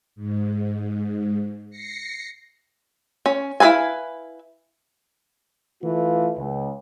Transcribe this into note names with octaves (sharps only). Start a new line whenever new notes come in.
G#2
A#6 C7 C#7
C#4
E4 G#4 B4 F5 G#5
E3 A3 F4
C#2